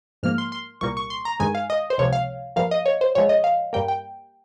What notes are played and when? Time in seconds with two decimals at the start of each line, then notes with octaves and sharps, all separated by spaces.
0.23 G#2 F3 A#3 F6
0.38 C6
0.52 C6
0.81 C2 A#2 G3 A#3 C#6
0.97 C#6
1.10 C6
1.25 A#5
1.40 G2 D#3 G#3 G#5
1.55 F5
1.70 D#5
1.90 C5
1.98 C#2 C3 F3 C#5
2.13 F5
2.56 G2 F3 A#3 F5
2.71 D#5
2.86 C#5
3.01 C5
3.15 A#2 F3 G#3 C#5
3.29 D#5
3.44 F5
3.73 G2 G3 A#3 G5
3.88 G5